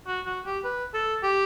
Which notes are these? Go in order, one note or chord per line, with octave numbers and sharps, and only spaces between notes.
F#4
F#4
G4
B4
A4
G4